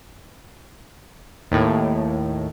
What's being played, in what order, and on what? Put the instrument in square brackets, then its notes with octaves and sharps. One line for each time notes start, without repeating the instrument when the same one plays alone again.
[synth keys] D#2 A2